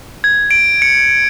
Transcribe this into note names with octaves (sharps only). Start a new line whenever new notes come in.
G#6
D7
C#7